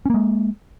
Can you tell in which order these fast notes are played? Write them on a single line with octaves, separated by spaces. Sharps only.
C#4 A#3 G#3